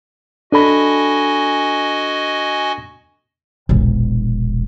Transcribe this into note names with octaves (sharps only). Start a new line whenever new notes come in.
D4 F#4 A4 D#5 G#5 B5
E1 A#1